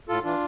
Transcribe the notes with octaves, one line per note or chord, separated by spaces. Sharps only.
A2 F4 A4
E3 D4 F4